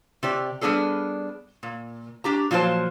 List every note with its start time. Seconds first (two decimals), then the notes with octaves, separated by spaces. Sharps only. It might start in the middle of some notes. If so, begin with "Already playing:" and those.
0.23 C3 G4 D5
0.61 G3 B3 C#4 D4 G#4 A4
1.63 A#2
2.24 D4 G4 A#5
2.51 A#2 F3 F#3 D4 C5 A5